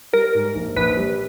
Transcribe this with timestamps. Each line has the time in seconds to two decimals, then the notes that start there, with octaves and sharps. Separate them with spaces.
0.13 G3 A#4
0.35 G#2
0.55 A#1
0.76 A#1 B4
0.97 G3